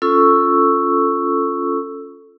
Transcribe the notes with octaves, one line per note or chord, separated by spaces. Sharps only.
C#4 F4 A4 C#6 E6